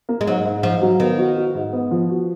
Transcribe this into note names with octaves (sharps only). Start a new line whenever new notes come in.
A#3
G#3
G#2 F#3
G#2
G#2 F3
F#3
D#3 B3
F#4
F#4
G#2
B3
F3
F#4